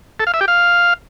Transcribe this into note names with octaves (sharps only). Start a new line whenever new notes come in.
A4
F5
E5
G4
F5